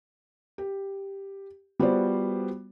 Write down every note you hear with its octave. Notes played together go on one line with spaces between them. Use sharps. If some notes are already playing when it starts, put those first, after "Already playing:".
G4
G3 B3 F4 F#4 C5 D5